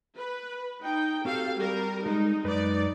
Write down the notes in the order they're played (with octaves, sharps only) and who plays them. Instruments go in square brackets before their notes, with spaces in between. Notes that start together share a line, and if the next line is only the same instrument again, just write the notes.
[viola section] B4
D#4 G5
[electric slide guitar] C4 F#4 G4 [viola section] A4 F5
[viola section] G3 A#4
[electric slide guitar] G#3 [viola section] D#4
[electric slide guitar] F#2 G#3 B4 [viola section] D#4 D5